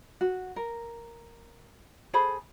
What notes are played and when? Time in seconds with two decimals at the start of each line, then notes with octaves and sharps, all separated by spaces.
0.21 F#4
0.56 A#4
2.14 G#4 A4 C5 B5